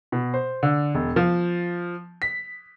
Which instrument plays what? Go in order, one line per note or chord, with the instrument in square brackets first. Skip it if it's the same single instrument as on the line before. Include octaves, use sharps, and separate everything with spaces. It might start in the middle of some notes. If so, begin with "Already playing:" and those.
[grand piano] B2
C5
D3
E1
F3
B6